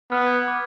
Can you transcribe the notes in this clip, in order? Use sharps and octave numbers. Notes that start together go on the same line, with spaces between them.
B3 F6
G#6
F6
D6